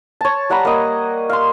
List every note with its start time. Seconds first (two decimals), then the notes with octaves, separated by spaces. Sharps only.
0.21 C#5 A5
0.50 G3 F#5 A#5 B5
0.65 A#3 D#5
1.29 F5 C6